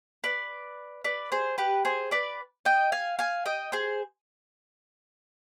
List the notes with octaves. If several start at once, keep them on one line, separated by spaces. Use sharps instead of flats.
B4 D5
B4 D5
G#4 C5
G4 B4
G#4 C5
B4 D5
D#5 G5
F5 G#5
F5 G#5
D#5 G5
G#4 C5